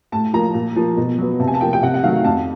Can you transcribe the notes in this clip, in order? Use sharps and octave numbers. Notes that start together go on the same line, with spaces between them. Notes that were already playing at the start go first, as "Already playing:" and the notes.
A2 A5
F3 A#3 A#5
A#2
F3 A#3
B2
F#3 B3
C3 A5
G#5
A5
F3 A#3 G5
G5
C3 F#5
F#5
D#3 F#3 A3 F5
F2 A5